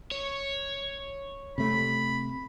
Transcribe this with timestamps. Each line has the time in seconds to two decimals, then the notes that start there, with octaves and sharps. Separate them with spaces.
0.11 C#5
1.58 C3 A3 B5